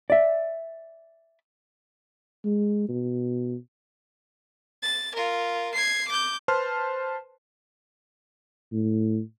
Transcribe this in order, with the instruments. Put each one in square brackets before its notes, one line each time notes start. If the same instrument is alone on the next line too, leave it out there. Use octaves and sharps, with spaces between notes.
[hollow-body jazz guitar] D5 E5
[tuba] G#3
B2
[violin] A6
F4 A#4
G#6 C7
D6 G6
[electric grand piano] B4 C5 A5 C6 F6
[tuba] A2